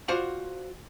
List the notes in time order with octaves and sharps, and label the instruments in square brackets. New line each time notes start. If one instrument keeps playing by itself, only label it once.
[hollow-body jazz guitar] F4 F#4 C5 D5 F5 F#5